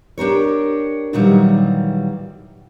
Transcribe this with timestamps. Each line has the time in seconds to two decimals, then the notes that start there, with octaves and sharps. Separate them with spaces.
0.18 D4 G4 A#4 C#5
1.13 A#2 D#3 E3 F#3 G3